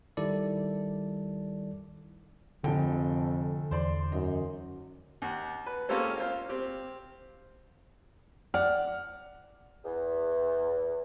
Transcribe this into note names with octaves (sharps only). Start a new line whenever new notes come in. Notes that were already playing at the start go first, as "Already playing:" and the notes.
D#3 G3 E4 A4 D5
F1 F2 D3 A4 G5
E2 C5 D5 C6
F#2 D#4
D#2 F#5
B4
A#3 C#4 F4 G4 A4 C5
F4 C5 F5
C4 G4
D5 F#5 F6
E2